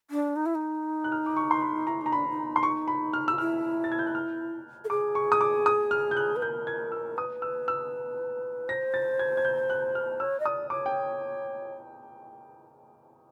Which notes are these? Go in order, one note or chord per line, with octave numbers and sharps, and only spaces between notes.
D4
D#4
E4
D#4
F#6
F6
D6
C#6
C6
B5
E4 A#5
D#4 A#5
D4 B5
D#4
C6
C#6
B5
F6
F4 E6
E4 F6
A6
G#6
G6
F#6
F6
A4
G#4 D6
C#6
D#6
D6
D#6
F6
G6
F#6
B4
A#4 G6
G#6
E6
B4 D#6
E6
E6
C5 A#6
A6
G#6
G#6
G6
F#6
F6
C#5 E6
D#5
D5 D#6
C#5 D6
G5